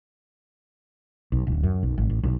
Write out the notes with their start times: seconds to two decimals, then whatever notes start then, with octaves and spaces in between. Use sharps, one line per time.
1.32 B1
1.47 D1
1.63 F#2
1.83 B1
1.98 G#1
2.10 A1
2.23 B1